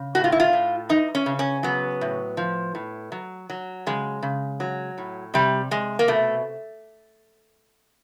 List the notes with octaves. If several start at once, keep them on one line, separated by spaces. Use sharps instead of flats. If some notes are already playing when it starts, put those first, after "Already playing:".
Already playing: C#3
A2 F#4
F4
E4
F4
A2
E3 D#4
C#4
C#3
C#4
F#3 B3
A2
F3
A2
F#3
F#3
C#3 G#3
C#3
F#3
A2
C3 G3
C3 G#3
A#3
B2 A3